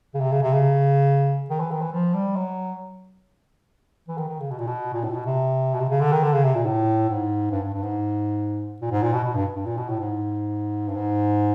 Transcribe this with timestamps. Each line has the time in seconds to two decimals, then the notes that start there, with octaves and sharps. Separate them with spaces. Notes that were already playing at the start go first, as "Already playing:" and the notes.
0.14 C#3
0.20 C3
0.32 C#3
0.43 C3
0.53 C#3
1.50 D#3
1.60 E3
1.71 D#3
1.82 E3
1.93 F3
2.14 G3
2.36 F#3
4.08 E3
4.18 D#3
4.29 D#3
4.40 C#3
4.51 B2
4.59 A#2
4.67 B2
4.93 A#2
5.04 A2
5.11 A#2
5.15 B2
5.26 C3
5.74 B2
5.80 C3
5.90 C#3
6.01 D3
6.12 D#3
6.23 D3
6.33 C#3
6.44 C3
6.55 A#2
6.66 A2
7.09 G#2
7.52 G2
7.63 G2
7.74 G2
7.84 G#2
8.82 A#2
8.91 G#2
9.03 A#2
9.14 B2
9.24 B2
9.35 G2
9.56 G2
9.66 A#2
9.78 B2
9.89 A2
10.00 G#2
10.89 G2
10.96 G#2